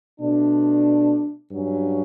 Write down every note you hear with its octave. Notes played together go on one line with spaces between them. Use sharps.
B2 A3 D4
G2 F#3 C#4